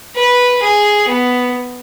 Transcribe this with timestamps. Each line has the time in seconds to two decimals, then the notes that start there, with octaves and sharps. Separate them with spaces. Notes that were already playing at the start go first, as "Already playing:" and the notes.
0.16 B4
0.62 G#4
1.08 B3